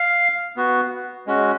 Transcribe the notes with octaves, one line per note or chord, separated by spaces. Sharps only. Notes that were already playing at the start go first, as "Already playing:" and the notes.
Already playing: F5
B3 F#4
G#3 C#4 F#4